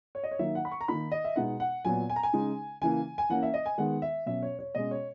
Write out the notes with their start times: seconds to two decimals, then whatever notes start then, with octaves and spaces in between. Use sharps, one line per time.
0.15 C#5
0.24 D#5
0.31 C#5
0.39 D#3 F#3 A#3 D#4 E5
0.55 F#5
0.65 B5
0.72 C#6
0.81 A#5
0.88 D#3 A#3 D#4 B5
1.12 D#5
1.25 E5
1.36 B2 G#3 B3 D#4 F#5
1.60 F#5
1.85 A#2 F#3 B3 G#5
2.10 G#5
2.16 A#5
2.23 G#5
2.33 C#3 G#3 D#4
2.81 C#3 E3 A#3 G#5
3.18 G#5
3.30 E3 A#3 C#4 F#5
3.43 E5
3.54 D#5
3.66 G#5
3.78 D#3 G#3 B3 F#5
4.02 E5
4.26 B2 F#3 C#4 E5
4.43 C#5
4.59 C#5
4.75 B2 G#3 C#4 D#5
4.91 C#5